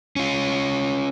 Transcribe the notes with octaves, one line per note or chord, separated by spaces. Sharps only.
C#4 F4